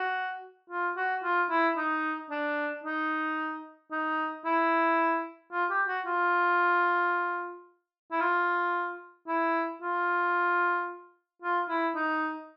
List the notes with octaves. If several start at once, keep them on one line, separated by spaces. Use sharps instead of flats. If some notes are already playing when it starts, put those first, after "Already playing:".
Already playing: F#4
F4
F#4
F4
E4
D#4
D4
D#4
D#4
E4
F4
G4
F#4
F4
E4
F4
E4
F4
F4
E4
D#4